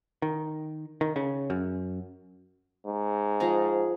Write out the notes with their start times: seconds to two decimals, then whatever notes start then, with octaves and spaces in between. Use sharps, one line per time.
0.22 D#3
1.01 D#3
1.16 C#3
1.50 F#2
2.87 G#2
3.40 F3 G#4 A#5